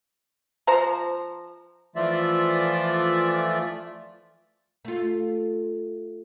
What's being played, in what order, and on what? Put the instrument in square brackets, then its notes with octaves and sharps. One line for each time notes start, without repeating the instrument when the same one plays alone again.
[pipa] F3 C5 A#5
[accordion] E3 F3 A3 F4 D5 E5
[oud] A3 F4